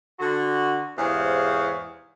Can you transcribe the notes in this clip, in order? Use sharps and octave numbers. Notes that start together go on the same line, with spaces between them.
D3 F#4
E2 G#2 C3 C#5 F5